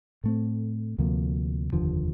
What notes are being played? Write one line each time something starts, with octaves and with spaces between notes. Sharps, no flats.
A2 A3 C4
D2 C3 F3 A#3
F1 D#2 D3 F3